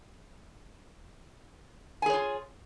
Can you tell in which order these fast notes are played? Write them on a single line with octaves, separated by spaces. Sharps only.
G#5 G#4 C#5 F4